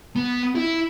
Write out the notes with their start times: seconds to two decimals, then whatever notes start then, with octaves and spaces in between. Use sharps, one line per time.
0.16 B3
0.56 E4